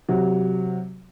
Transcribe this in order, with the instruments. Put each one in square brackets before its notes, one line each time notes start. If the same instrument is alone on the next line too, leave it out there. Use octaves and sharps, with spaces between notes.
[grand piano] C3 F#3